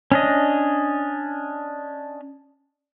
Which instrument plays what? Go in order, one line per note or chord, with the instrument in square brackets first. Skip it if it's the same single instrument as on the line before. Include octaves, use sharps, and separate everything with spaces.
[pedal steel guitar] C#4 D4 D#5